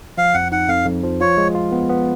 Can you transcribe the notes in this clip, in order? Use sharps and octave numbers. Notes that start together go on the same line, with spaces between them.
F3 F5
F2 F#5
D#4 F#5
F2 F5
F2
F3
F4 C#5
G#3
F4
B3
B3